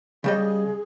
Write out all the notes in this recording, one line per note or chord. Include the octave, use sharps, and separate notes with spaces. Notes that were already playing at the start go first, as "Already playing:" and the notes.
C#3 G3 G#4 D#5